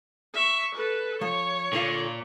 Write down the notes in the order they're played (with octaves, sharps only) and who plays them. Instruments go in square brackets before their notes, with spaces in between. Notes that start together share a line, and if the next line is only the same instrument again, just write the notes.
[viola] E5 C#6
A4 B4
[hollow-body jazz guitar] F3 [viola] C#5
[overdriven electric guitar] A#2 [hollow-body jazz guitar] D3 F4 F5